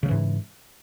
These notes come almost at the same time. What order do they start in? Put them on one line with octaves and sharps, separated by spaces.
C#3 F#3 E3 G#2